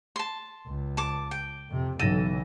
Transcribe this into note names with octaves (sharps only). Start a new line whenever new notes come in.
A5 C6
C#2
A5 D6
G5
F2 C3
B1 C#3 E3 A4 A#6 D#7